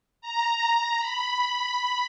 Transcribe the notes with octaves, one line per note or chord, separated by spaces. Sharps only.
A#5
B5